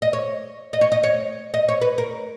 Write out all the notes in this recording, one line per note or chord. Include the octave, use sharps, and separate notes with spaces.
D#5
C#5
D#5
C#5
D#5
C#5
D#5
C#5
B4
A#4